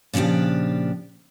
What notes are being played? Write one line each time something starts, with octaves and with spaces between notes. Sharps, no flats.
A#2 C#3 F3 D4 G4